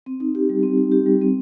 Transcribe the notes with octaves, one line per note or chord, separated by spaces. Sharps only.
C4
D#4
G4
G3
C4
D#4
G4
G3
C4